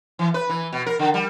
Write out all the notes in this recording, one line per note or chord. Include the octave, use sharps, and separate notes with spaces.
E3
B4
E3
B2
A#4
D3
G3